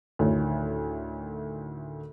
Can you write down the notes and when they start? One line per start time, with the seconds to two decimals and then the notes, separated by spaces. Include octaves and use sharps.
0.19 D2 A2 D#3 C#5